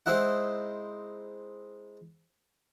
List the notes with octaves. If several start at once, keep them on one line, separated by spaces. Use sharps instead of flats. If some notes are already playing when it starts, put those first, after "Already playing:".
G#3 C4 D#4 E4 F#5